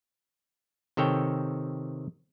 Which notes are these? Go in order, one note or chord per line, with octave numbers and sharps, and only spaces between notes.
C3 D#3 A4 C#5 G5